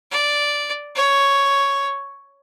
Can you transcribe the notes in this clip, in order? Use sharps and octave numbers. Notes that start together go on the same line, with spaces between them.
D5
C#5